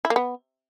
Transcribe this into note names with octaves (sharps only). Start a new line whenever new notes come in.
E4
A#3
B3